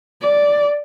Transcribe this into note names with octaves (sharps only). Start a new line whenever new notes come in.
D5